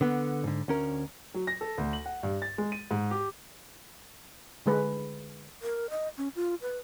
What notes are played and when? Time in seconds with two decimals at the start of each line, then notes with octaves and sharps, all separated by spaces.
0.01 D3 B3
0.44 G#2 D3
0.68 D2 C#4 A#4
1.34 F#3
1.47 A#6
1.61 A4
1.78 D2
1.93 F#7
2.06 F#5
2.23 G2
2.42 A6
2.58 G#3
2.72 D#7
2.91 G#2
3.11 G4
4.66 D3 G#3 B4
5.62 A#4
5.90 D#5
6.18 C#4
6.35 F4
6.62 B4